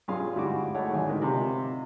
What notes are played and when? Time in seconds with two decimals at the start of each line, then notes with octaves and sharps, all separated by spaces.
0.08 G2 C#4 F4 G#4 F5 C6
0.34 D2 G#2 G3 E4 F#4 D6
0.74 A3 D#4 G#4 C#5 D5 F#5
0.93 G#1 G#5
1.07 G#2 D3 E4 A#4
1.22 C3 F4 D#5 C6